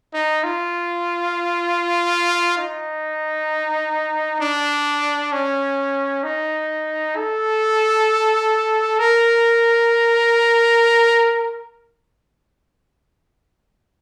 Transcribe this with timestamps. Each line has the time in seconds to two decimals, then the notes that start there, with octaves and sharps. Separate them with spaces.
0.14 D#4
0.44 F4
2.58 D#4
4.40 D4
5.32 C#4
6.24 D#4
7.16 A4
8.99 A#4